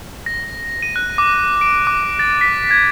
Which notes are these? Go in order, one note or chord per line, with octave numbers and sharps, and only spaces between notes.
A#6
D#7
F#6
D6
D7
D6
A6
B6
G#6